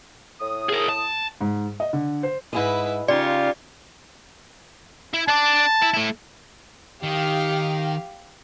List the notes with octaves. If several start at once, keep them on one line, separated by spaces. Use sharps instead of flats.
A2 D#6
G#4 A#4
A5
G#2
D#5
D3
C5
G#2 E4 G#4 B4 D#5
C#3 D#4 F4 G4 D5 F5
E4
D4 D5 A5
E4
A3 E4
D#3 G4 F5